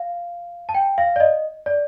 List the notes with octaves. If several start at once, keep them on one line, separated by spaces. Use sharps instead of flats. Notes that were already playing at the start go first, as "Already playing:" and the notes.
Already playing: F5
A5
G5
F5
D5
D#5
D5